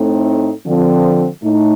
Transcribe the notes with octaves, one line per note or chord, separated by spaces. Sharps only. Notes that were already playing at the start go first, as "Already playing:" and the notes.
Already playing: A2 A3 C4 D#4
D3 F3 C4
A2 A3 D#4